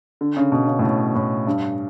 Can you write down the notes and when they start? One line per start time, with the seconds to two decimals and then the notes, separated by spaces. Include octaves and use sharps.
0.21 D3
0.37 C#3
0.52 B2
0.68 C#3
0.79 A2
0.83 B2
1.15 A2
1.47 G2